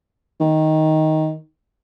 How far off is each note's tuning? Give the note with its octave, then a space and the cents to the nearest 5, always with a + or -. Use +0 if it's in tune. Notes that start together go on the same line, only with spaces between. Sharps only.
D#3 +10